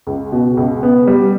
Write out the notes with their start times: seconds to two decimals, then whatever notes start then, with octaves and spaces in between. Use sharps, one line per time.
0.07 C#2
0.32 B2
0.57 C#2
0.83 B3
1.07 G3